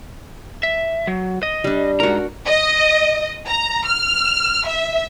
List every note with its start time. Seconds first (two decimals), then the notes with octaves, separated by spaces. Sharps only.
0.63 E5
1.07 F#3
1.43 D#5
1.64 G3 D4
2.00 G#2 F#4 A#4 A#5
2.46 D#5
3.47 A#5
3.86 F6
4.66 E5